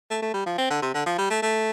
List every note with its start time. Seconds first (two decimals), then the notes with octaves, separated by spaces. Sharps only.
0.10 A3
0.22 A3
0.34 G3
0.46 F3
0.58 C4
0.70 D3
0.82 C3
0.94 D3
1.06 F3
1.18 G3
1.31 A3
1.42 A3